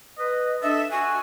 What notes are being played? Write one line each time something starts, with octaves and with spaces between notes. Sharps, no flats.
B4 D#5
D4 A4 D#5 E5
F#4 G#5